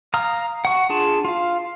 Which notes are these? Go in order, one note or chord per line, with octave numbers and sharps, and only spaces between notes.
F5 A#5 D#6 F6
F#5 C#6
D4 F4 G#4 A5
F4 F5